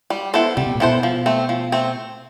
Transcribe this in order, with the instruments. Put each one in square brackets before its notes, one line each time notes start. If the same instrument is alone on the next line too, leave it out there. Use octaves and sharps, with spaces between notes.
[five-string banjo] G3
B3 E4 A4 C5
[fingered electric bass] C3 [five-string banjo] G3
[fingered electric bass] B2
A#2
[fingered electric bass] B2 [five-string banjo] B3 E4 A4 C5
[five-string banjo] F3
A3 C4
F3
A3 C4